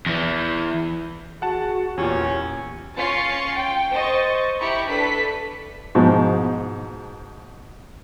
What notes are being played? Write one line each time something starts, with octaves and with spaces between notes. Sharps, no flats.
E2 E3
F#4 G#4 F#5 A5
E2 A#2 C#4 F4 G4
C#4 F4 C#6 A6 C7
G5
C5 D#5 C#6 A6
E4 G4 A#5 B5 C#6
D4 A4 B4 B6
G#2 B2 F3